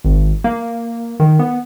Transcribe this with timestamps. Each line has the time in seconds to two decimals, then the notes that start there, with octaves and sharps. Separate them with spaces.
0.04 G#1
0.44 A#3
1.20 D#3
1.39 B3